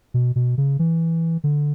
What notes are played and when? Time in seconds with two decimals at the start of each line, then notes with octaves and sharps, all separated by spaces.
0.14 B2
0.36 B2
0.58 C#3
0.79 E3
1.44 D3